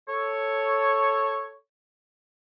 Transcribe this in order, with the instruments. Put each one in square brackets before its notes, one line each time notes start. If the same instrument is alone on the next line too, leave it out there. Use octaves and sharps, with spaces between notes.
[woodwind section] A4 C#5